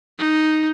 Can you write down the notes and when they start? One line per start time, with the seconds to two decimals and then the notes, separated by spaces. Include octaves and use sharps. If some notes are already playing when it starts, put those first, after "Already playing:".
0.19 D#4